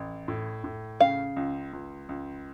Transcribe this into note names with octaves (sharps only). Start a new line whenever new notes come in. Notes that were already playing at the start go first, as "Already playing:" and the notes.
Already playing: A1
A2
A2
C#3 F5
C#2
C#2
C#2